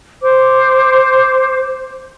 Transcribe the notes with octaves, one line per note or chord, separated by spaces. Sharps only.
C5 D6